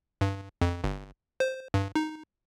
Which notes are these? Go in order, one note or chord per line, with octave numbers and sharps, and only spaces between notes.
G2
F2
G1
C5
G2
D#4